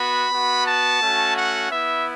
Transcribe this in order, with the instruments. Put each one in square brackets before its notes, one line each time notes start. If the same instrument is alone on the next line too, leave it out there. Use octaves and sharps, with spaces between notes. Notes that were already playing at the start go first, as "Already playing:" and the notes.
Already playing: [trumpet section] B3 F#4 B5
B3 F#4
A5
A3 C#4 F#4
F#5
B3 E4 E5